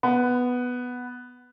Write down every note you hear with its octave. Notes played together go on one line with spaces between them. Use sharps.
B3